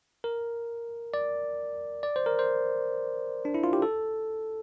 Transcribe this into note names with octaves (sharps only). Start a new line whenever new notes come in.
A#4
D5
D5
C5
A#4
C5
D4
E4
F4
G4
A4